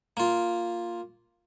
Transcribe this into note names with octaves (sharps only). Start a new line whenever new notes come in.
A#3 F4